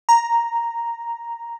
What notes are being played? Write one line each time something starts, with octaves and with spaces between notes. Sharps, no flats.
A#5